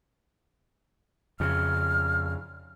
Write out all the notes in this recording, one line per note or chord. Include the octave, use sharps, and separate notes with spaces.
F2 C#3 F6